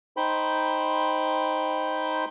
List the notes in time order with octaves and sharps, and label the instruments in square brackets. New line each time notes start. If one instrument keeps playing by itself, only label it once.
[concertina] D#4 C5 G5 B5